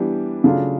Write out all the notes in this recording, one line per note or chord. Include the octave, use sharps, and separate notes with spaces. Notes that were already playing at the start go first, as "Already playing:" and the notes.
Already playing: E3 G3 B3 D4 G4
C#3 F#3 A3 D4 F4